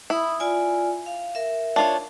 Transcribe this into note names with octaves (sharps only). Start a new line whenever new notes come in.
E4 B5 D#6
F4 D5 G#5
F5
A#4 E5
D4 F4 C#5